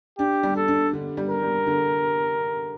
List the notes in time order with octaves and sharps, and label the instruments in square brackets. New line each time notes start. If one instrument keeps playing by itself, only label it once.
[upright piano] D4 [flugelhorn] G4
[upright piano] G3
[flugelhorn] A4
[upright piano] D4
D3
G3
[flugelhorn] A#4
[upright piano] G3
D3